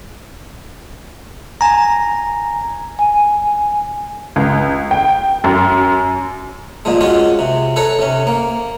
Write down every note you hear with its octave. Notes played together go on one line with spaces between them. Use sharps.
G#5 A#5
G#5
C#2
G5
F#2
A#2 F3 G#3
G#3 C#4 F4 F#4
C3
A4 B4 C#5 A#5
C3 C#4
A#3